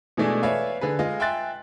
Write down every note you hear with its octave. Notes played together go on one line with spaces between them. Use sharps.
B2 E3 G#3 A3 D4 G#4
B4 C#5 D5 E5 F5 G#5
D3 G#4 B4
G#3 F4 D#5
E5 G5 G#5 C6 F#6 A6